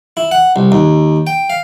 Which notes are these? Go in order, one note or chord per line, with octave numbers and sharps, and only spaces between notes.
E4
F#5
C2
D#2
G5
F5